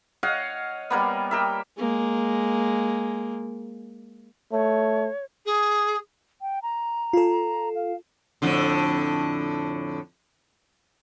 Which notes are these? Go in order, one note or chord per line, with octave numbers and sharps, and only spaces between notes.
C#5 D#5 F5 F#5
G3 A#3 B3
G4 A#4 E5
G#3 A#3
A3 C#5
G#4
G5
A#5
F4 A4
F5
F2 A2 D3